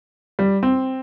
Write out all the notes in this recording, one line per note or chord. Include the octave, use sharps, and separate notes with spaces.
G3
C4